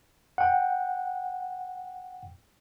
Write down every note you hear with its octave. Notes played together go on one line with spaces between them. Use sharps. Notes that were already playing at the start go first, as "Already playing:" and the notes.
F#5 G5